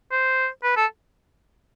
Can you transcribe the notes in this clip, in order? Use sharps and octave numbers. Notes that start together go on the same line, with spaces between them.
C5
B4
A4